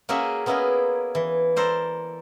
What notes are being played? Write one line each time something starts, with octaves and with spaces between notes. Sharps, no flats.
A#3 C#4 F#4 G#4 E5 G#5
A#3 B3 C#4 E4 G#4 A#4
E3
A4 A#4 C5 D5